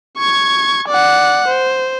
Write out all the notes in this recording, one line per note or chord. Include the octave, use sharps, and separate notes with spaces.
C#6 G#6
D5 F#5
C5